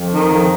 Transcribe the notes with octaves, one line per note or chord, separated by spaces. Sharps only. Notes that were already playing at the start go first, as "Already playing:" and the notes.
Already playing: F2
D#3
F2